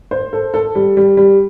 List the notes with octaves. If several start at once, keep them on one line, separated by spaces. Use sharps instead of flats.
C5
A4
A4
G3
G3
G3